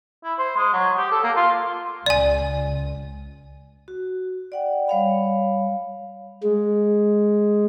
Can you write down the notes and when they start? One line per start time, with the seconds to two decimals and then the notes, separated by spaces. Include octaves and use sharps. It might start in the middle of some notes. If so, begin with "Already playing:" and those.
0.24 E4
0.38 C5
0.57 G#3
0.73 F#3
0.97 G4
1.12 A4
1.23 A#3
1.36 F4
2.06 C#2 D5 G#5
3.88 F#4
4.52 D5 F#5 G5
4.88 G3 C#5 F5 B5
6.43 G#3